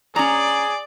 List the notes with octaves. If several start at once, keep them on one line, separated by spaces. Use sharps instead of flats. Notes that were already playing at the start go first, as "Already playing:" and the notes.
C#4 G#4 D5 A#5